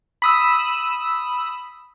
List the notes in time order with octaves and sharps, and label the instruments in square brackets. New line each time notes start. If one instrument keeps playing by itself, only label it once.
[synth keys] B5 D#6 E6